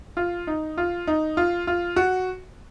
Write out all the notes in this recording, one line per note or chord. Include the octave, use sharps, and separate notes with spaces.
F4
D#4
F4
D#4
F4
F4
F#4